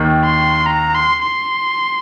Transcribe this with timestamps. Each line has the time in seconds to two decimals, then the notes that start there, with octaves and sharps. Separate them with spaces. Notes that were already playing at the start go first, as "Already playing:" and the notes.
Already playing: D#2 D#3
0.25 C6
0.66 A#5
0.95 C6
1.23 C6